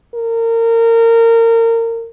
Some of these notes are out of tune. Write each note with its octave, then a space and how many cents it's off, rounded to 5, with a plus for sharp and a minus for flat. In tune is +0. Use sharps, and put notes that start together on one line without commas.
A#4 -25